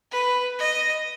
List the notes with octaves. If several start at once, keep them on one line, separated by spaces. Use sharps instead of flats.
B4
D#5